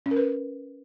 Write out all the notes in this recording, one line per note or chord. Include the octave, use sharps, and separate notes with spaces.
C#4
A#4
B4